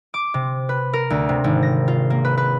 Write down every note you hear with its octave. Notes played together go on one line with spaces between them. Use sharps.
D6
C3
B4
A#4
D2
C3
G#1
A#6
F4
A#3
B4
B4